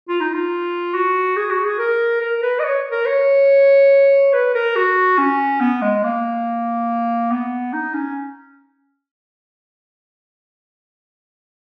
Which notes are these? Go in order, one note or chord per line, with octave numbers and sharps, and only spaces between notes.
F4
D#4
F4
F#4
G#4
F#4
G#4
A#4
A#4
B4
D#5
C#5
A#4
C#5
B4
A#4
F#4
C#4
B3
G#3
A#3
B3
D#4
C#4